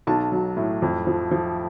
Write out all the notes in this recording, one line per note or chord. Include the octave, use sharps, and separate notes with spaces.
B1 A5
F#3
A2
F2
F3
F3